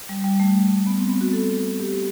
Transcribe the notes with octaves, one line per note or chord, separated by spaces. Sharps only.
G3
G3
A3
B3
C4
B3
F#4
A4
G4